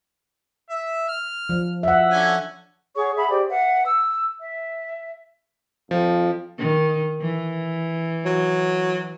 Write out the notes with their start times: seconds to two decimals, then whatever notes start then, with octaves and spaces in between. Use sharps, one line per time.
0.70 E5
1.09 F6
1.49 F3
1.83 E5 F#5
2.11 D3 C#4 G#5
2.96 G#4 C#5 F#5 C#6
3.16 G#4 E5 F#5 B5
3.29 G4 C5 D5
3.50 B4 E5 F#5
3.86 E6
4.40 E5
5.91 F2 F3
6.59 D#3
7.21 E3
8.25 F#3